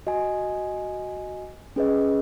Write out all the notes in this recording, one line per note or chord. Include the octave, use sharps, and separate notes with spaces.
F#4 D#5 G#5
C#4 G#4 B4 D#5